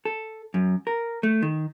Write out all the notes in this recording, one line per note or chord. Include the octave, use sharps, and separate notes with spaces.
A4
F#2
A#4
A3
D#3